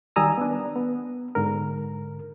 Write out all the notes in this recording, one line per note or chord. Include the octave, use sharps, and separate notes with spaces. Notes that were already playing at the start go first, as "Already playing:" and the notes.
D#3 G3 G#5 A#5 D#6 E6
B3 D4
B3
G#2 D3 A#4